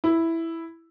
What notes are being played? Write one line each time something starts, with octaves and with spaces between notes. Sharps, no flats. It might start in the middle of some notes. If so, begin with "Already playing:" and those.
E4